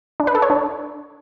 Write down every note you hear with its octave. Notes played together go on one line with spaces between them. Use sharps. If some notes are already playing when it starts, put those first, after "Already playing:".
D4
B4
A4
C#5
D4